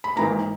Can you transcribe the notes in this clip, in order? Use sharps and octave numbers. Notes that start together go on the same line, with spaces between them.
B5
G#1 G#2 E3 A#3 A#5